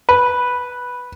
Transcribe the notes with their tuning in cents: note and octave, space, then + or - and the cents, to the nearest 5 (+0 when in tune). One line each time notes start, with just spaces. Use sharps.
B4 -5